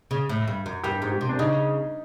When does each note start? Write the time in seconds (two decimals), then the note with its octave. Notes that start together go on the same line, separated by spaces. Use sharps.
0.11 C#3
0.29 A2
0.48 G2
0.66 F#2
0.83 G2 G4
1.02 G#2
1.11 G4
1.21 C3
1.29 D4
1.39 C#3 D#4